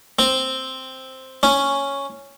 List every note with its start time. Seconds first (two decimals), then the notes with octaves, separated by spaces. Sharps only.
0.19 C4
1.43 C#4